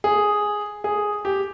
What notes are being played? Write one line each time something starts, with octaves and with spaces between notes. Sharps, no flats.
G#4
G#4
G4